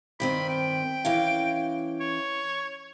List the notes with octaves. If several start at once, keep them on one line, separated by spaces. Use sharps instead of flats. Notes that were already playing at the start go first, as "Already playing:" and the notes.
G2 D#3 C4 B5
G5
E3 C#4 F5
C#5